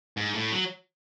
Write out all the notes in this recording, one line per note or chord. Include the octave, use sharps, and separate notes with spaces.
G#2
A2
F#3